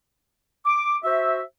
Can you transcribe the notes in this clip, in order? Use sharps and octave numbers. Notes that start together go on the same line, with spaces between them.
D6
F#4 C5 E5